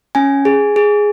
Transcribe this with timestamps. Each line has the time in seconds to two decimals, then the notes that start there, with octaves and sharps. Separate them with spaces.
0.15 C#4 G#5
0.45 G#4
0.76 G#4